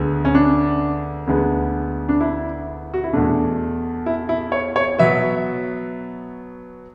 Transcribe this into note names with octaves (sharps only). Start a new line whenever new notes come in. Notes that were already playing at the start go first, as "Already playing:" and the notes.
Already playing: D2 D3 G#3 B3
C#4
D4
D2 D3 G#3 B3
D4
E4
F#4
E4
E2 B2 A3 D4
E4
E4
C#5
C#5
B2 F#3 B3 E5